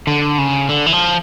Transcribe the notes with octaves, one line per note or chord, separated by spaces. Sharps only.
D3
C#3
D3
E3
F3